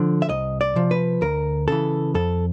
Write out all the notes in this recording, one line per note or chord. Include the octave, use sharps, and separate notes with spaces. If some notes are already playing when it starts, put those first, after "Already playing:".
Already playing: D3 F3
E5
C2 D#5
D5
C3 F3
B4
D2 A#4
C#3 E3 A4
F2 A4